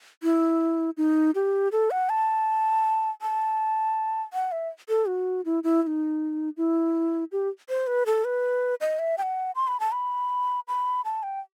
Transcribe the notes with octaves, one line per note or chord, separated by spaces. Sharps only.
E4
D#4
G4
A4
F#5
A5
A5
F#5
E5
A4
F#4
E4
E4
E4
D#4
E4
G4
C5
B4
A4
B4
D#5
E5
G5
F#5
C6
B5
A5
B5
B5
A5
G5